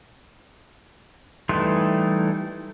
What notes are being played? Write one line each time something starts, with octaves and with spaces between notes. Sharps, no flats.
E3 G3 A3 D#4 C6